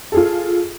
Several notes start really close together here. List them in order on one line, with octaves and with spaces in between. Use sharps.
A4 G#4 F4